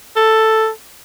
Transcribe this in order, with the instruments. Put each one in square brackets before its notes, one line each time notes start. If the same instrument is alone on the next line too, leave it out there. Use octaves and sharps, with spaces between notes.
[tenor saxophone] A4